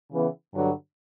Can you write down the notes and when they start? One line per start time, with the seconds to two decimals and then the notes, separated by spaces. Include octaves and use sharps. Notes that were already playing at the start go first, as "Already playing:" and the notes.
0.11 C#3 E3 B3
0.54 G2 D3 F#3